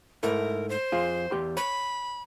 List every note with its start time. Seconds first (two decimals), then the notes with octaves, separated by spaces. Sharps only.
0.23 G#2 A3 E4 A#4
0.69 C5
0.92 F2 F4 G#4
1.31 E2 G4 C6
1.57 C#5 B5